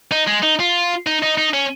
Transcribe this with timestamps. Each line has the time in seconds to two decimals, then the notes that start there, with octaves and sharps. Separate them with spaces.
0.12 D#4
0.27 G#3
0.43 D#4
0.60 F4
1.07 D#4
1.22 D#4
1.38 D#4
1.53 C#4